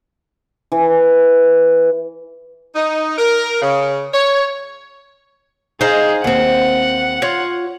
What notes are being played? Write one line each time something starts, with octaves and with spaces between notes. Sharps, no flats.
E3
D#4
A#4
C#3
C#5
D#4 G#4 C5 F5
D#2 C4 F#5
F4 C#5